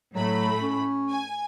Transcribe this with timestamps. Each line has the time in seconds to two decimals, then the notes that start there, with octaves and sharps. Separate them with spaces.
0.15 A2 F#3 A3 B5
0.61 C#4
1.11 G#5